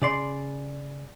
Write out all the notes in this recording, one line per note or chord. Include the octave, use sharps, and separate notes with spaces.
C#3 D5 C6